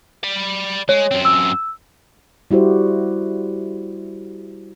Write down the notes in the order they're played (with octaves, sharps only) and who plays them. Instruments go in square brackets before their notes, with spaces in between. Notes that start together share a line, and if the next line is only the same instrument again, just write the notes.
[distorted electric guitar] D5 B5
[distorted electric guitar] G#3 [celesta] C#5
[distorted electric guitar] F#2 C4
[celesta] E6
[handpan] G3 E4 F#4 G4 C5